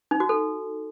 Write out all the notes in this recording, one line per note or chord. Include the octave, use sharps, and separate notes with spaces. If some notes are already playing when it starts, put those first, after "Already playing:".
D#4
F#4
A4